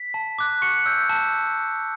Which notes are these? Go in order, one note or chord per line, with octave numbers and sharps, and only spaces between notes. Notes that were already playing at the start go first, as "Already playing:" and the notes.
Already playing: B6
A5
D6 F#6
C#6 C#7
E6 G6
A5